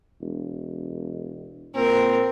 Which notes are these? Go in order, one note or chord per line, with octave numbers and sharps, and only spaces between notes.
E1
A#2 C4 A#4